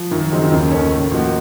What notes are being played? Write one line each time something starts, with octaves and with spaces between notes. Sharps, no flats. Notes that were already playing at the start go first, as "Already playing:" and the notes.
Already playing: F3
F#2 D#3
C#3 F#3 C4 D#4
D#3
D#2 C#3
D#3 A3 C#4
A2
F3 A#3 D#4 F#4